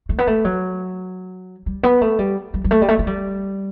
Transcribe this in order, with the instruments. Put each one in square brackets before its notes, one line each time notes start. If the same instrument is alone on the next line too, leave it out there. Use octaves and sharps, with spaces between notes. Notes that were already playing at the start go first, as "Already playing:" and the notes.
[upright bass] A3
B3
A3
F#3
G3
B3
A3
G3
G3
G3
A3
G3
A3
A3
G3